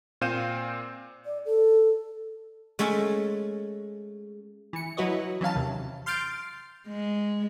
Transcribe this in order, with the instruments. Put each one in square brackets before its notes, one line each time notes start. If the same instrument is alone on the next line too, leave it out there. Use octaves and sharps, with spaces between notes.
[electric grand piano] A#2 C4 F5 G6 D#7 E7
[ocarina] D5
A4
[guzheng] G#3 A3 C#4 A4 G#5
[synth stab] E3 C#7
F#3 E4 F#4 B4 C#5 D#5
E3 F#3 C#4 F5 A5
D#2 C3
C6 F6 G6 A6 C7 D7
[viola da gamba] G#3